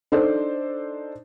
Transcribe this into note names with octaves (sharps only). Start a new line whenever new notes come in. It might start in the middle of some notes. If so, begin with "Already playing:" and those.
D4 D#4 A4 C5 D5